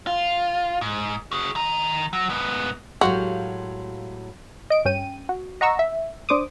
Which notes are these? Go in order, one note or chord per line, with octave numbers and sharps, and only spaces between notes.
F4
G#2
F#4 G#4
D#3 A#5
F#3
G#2 B3
A2 F#3 G#3 F#4 G4 F5 C6
D#5 D7
G2 C#4 G5 D#7
F#4
D#5 F#5 A#5 C#6 E6
E5
D4 C5 D6 D#6